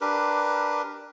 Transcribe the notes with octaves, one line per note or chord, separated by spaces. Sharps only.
D4 G4 A#4 B4